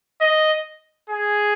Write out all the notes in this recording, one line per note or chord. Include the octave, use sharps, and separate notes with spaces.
D#5
G#4